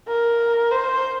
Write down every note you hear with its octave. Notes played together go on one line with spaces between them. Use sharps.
A#4
C5